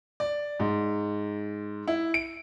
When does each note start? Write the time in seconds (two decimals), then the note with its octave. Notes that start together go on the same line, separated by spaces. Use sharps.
0.20 D5
0.60 G#2
1.88 E4
2.14 D7